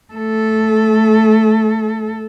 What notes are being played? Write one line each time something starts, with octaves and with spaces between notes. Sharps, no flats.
A3 A4